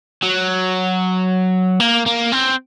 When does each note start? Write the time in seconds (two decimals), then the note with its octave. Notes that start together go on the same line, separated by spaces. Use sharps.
0.22 F#3
1.80 A#3
2.06 A#3
2.32 C4